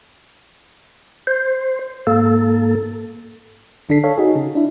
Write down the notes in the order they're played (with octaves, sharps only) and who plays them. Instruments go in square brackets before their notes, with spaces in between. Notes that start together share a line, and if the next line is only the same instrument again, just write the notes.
[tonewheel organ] C5
G#2 A#3 A4
[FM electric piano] A1 D3 D4 A4 B6 C7
A4 C#5 F5
D#4 F#4 G#4
C#3
D4 E4